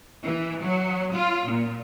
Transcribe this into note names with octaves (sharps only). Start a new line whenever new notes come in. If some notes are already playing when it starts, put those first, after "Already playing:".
E3
F#3
F4
A#2